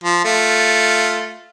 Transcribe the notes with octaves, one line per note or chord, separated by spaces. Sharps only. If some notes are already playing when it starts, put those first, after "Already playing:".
F3
A3 F4